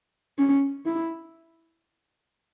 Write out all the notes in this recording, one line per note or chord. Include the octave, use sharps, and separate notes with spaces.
C#4
E4